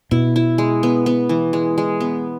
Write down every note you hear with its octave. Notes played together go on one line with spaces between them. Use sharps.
B2 E4
E4
G#3
B3
B3
E3
G#3
G#3
B3